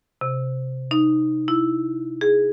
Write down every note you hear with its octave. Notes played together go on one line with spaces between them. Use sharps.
C3
D#4
E4
G#4